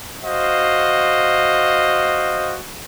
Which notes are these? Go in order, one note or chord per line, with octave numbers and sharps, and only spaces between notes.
F#4 C5 D#5 F5